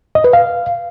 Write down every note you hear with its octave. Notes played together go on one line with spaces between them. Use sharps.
D#5
B4
F5